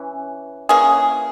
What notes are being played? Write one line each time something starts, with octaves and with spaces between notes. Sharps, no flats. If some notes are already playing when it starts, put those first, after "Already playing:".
Already playing: E3 C#4
E3 A#3 C#4 G#4